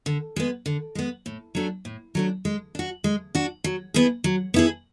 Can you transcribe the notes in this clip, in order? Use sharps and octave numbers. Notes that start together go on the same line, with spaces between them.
D3
G#3 B3
D3
G#3 B3
A2
F#3 A3 D4
A2
F#3 A3 D4
G#3
D4 F#4
G#3
D4 F#4
F#3
B3 E4 G#4
F#3
B3 E4 G#4